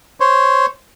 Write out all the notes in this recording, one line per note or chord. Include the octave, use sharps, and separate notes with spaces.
C5 C#5